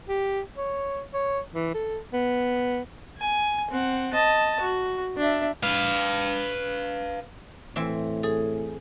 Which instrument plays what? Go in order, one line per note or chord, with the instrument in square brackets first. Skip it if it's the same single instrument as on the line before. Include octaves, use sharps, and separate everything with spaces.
[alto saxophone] G4
C#5
C#5
E3
A4
B3
[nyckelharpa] G#5
C4 F#5
D#5 A5
F#4
D4 E5
[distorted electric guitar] B4 F5
[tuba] A2 [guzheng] E3 C4 E5
[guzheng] G#4 [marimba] A4